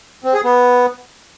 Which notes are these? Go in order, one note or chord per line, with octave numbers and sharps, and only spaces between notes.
C4
G#4
B3